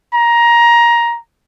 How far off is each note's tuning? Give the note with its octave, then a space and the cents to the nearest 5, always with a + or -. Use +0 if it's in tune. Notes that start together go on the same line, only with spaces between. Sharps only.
A#5 +15